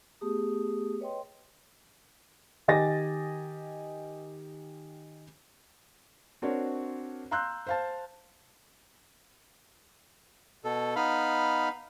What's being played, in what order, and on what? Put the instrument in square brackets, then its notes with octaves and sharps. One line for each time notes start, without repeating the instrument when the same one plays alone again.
[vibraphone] A3 B3 G4 G#4 D#6
B4 C#5 D#5 G5 C6
[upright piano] D#3 G4 D#5 G#5 A6 A#6
[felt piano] C4 D4 F#4 A#4 C5 C#5
F5 A#5 C6 E6 F#6 G6
C5 F5 A5
[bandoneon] B2 A4
B3 D#4 F5 B5